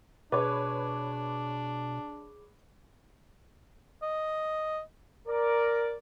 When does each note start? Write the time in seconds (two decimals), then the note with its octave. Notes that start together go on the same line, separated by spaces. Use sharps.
0.32 B2 D4 G#4 B4 C#5 D6
4.03 D#5
5.28 A#4 D5